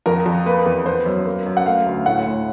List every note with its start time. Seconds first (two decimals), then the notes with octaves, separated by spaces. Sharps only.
0.06 F2 A#4
0.26 F2
0.46 A#3 B4
0.66 E2
0.86 B3 C5
1.06 F#2
1.26 A#3
1.46 F#2
1.57 F#5
1.66 A3 F5
1.86 D2
2.06 A2 F#5
2.26 A2